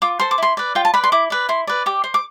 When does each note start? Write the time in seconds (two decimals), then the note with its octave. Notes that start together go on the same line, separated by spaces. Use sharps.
0.02 F4 D6
0.20 A4 C5 C6
0.31 D6
0.38 E4 C6
0.57 B4 D5
0.75 F4 G5
0.85 A5
0.94 B4 D5 B5
1.04 C6
1.12 E4 D6
1.30 B4 D5
1.49 E4 C6
1.67 B4 D5
1.86 G4 D6
2.04 C5
2.14 D6